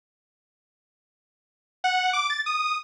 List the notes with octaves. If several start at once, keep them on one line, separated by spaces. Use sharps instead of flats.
F#5
D6
A6
D#6